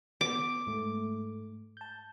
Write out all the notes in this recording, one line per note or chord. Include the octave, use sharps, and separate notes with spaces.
B3 D6
G#2 A3
A5 G6